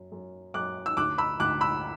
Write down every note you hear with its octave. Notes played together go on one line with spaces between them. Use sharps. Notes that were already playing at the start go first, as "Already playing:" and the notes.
Already playing: F#2
F#2
F#2 D6 F#6
E6
D2 D6 F#6
B5 E6
D2 D6 F#6
B5 E6